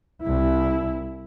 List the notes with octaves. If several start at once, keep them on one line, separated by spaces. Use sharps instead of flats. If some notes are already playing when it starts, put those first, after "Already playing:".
C2 E4